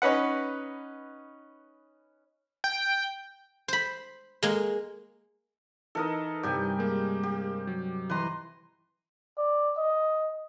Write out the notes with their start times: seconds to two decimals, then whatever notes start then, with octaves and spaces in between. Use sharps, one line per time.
0.02 C#4 D#4 B4 F#5
2.64 G5
3.68 C5 B5
4.42 G#3 A#3
5.95 E3 D#4 A4 A#4 D#5
6.43 G2 C3 G4 G5 G#5
6.79 G#3 A#3
7.23 G4
7.67 F#3
8.10 E3 B4 D#5 A#5 C6
9.38 D5
9.77 D#5